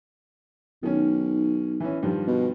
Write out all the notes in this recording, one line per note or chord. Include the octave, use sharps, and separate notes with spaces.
B1 D#3 C#4
E3 C#4
G2 D#3 F3
B2